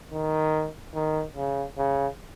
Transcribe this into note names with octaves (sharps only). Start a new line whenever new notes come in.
D#3
D#3
C#3
C#3